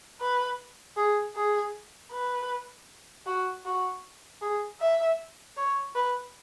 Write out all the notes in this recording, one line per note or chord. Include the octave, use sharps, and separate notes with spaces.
B4
G#4
G#4
B4
F#4
F#4
G#4
E5
C#5
B4